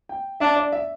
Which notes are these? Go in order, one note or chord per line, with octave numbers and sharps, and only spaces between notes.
G5
D4 E5
D5
E5